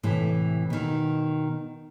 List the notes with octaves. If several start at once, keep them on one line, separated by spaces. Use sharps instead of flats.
A2 C3 E3
B2 D#3